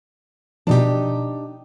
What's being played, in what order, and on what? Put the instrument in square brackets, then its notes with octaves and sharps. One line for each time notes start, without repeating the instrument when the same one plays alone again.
[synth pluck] B2 F3 [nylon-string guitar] D4 D#4 G4